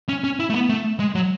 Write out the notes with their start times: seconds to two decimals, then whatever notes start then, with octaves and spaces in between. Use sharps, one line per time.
0.09 C#4
0.24 C#4
0.40 E4
0.50 A3
0.54 B3
0.69 A3
1.00 G#3
1.15 F#3